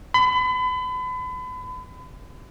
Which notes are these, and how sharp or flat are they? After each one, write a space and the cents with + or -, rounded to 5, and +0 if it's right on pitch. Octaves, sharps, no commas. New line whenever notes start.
B5 +35